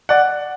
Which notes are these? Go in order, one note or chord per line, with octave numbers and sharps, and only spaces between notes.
D5 F#5